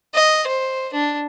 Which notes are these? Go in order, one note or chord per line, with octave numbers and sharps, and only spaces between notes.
D#5
C5
D4